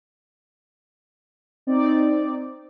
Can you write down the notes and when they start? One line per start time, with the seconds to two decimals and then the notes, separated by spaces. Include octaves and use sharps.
1.67 C4 D#4 D5